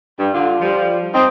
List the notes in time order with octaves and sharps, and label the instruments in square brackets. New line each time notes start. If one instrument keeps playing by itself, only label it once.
[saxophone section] G2
[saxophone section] D3 [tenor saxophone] F4
[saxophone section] F3 G3
[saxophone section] C4 [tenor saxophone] D#4